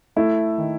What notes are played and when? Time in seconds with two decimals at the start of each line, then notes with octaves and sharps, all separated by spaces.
0.16 A3 E4
0.58 D#3